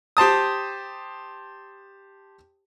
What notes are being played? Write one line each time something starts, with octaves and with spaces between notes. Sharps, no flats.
G4 C5 A5 D#6